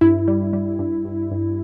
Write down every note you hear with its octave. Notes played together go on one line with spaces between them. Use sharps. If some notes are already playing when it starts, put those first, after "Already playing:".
G2 E4
G3
G3
G2
G2
G2